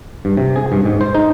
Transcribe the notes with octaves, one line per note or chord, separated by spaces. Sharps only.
G2
C3
G#4
G2
G#2
C5
D#4